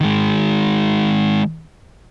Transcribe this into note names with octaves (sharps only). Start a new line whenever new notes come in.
D#3 G#3